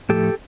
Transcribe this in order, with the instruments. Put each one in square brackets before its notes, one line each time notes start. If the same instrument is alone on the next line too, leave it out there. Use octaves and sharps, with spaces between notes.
[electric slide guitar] A2 F3 A3 G4 A4